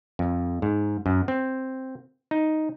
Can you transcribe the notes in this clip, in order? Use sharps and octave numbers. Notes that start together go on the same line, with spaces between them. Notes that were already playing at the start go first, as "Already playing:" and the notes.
F2
G#2
F#2
C4
D#4